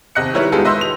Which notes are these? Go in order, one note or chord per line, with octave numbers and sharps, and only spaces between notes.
D#2 C3 D#5 F#6 C#7
D#3 G3 E4 A#4 B4 C#5
G#3 B3 D#4 F4 G4 A4
B4 D#5 E5 C6 E6 G6
F7